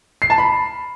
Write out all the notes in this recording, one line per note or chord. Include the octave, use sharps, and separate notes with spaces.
C7
A5
B5